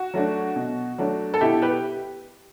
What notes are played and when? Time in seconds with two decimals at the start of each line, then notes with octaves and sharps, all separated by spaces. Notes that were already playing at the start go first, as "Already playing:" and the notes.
Already playing: F#4
0.14 F#3 A3 D4
0.56 B2
0.98 F#3 A3 D4
1.34 A4
1.41 B2 E4 G4
1.62 G4 B4